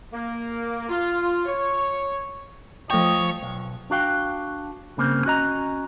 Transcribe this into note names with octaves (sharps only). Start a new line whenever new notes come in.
A#3
F4
C#5
F3 A3 C#5 D#5 G5
B1
D4 F#4 F5 G5
G2 C#3 A#3 C4
C#4 F#4 D#5 A#5